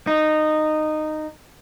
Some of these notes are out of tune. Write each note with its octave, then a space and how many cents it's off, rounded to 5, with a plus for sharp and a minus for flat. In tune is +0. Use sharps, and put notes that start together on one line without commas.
D#4 -15